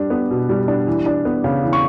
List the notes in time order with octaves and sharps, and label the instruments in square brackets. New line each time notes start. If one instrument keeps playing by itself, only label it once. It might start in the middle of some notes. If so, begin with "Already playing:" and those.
Already playing: [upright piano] G3 D4
B3
B2
G3
D4
E3
D4
B3
C#3
E3
C#6